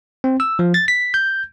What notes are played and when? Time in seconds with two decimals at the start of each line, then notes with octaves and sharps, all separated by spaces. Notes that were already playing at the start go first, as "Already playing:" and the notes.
0.24 C4
0.40 E6
0.59 F3
0.74 A6
0.88 B6
1.14 G6